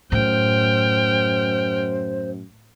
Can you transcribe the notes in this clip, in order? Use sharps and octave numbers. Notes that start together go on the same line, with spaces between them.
F#2 A2 C5 G5 F6